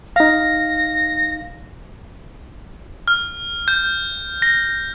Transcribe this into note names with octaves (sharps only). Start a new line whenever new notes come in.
D#4 F5 A#6
F6
G6
A#6